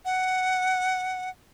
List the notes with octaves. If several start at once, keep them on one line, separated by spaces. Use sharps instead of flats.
F#5